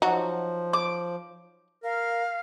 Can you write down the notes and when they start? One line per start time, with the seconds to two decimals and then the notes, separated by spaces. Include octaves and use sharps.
0.02 F3 F#3 D#4 F#4
0.73 D6
1.84 A#4 F5